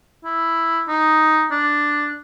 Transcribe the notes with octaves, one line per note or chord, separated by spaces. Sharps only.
E4
D#4
D4